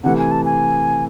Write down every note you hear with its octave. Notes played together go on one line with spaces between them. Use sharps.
C3 E3 A3 F#5
G#5
A5
G#5